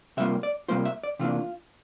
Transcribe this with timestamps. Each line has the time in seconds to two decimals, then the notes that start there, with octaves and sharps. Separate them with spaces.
0.17 C3 G3 A#3 F4 E5
0.43 D5
0.68 C3 G3 A#3 F4 C5
0.85 E5
1.03 D5
1.19 C3 E3 G3 A#3 D4 F4